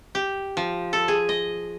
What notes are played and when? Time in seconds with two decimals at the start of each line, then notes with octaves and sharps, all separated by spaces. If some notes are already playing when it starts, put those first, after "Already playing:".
0.15 G4
0.57 F3
0.93 A4
1.08 G#4
1.29 D#5